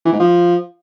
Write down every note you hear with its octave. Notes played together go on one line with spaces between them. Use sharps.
E3
G#2
F3